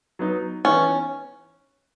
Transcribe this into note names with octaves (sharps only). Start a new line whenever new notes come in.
F#3 B3 D#4
E3 B3 C#4 D#4